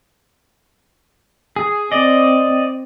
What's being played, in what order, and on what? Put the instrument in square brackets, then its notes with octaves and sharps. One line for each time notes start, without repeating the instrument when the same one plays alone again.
[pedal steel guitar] G#4
[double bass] C4 [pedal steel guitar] D5 D#5